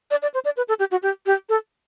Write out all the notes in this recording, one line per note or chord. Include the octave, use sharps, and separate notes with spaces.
D5
D5
C5
D5
B4
A4
G4
F#4
G4
G4
A4